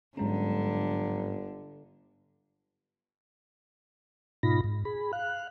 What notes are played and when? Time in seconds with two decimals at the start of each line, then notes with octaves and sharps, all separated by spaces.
0.17 G1 G#2 D3 F#3 G#3 C#4 A#5
4.43 G#2 B2 D#4 F4 B5 A#6
4.64 G#2
4.85 G#4 B5
5.13 F5 F#6